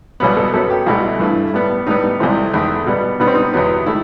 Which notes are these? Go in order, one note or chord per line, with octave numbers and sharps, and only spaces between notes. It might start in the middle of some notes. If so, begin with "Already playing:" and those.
C2 B2 F#3 B3 B4
A4
F#2 F#3 B3 A4
G4
C2 B2 A3 E4
G2 E3 A3
A2 G3 B3
A2 G3 B3 D#4
C2 C3 E3 A3 C4
E2 D#3 A3
B2 G3 B3
B2 G3 B3 D#4
C4
D#4
E2 C3 F#3 B3
D#3 A3 E4